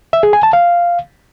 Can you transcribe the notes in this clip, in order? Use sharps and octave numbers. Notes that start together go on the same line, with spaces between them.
E5
G#4
G#5
A5
F5